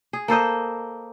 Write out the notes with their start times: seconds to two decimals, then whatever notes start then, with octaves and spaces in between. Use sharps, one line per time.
0.13 G#4
0.28 A#3 A4 C5 D#5